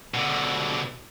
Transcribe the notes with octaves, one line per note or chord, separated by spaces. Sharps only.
B2 D3